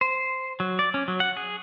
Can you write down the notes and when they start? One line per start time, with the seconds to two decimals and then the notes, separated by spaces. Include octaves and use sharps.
0.01 C5
0.60 F#3
0.79 D5
0.94 C#4
1.08 F#3
1.20 F#5
1.37 G#4